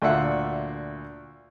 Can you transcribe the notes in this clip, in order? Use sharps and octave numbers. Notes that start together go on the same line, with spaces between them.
D2 A#2 D4 E5 F#5